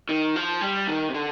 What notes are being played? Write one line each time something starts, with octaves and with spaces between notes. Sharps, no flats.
D#3
F3
G3
D#3
C3
D3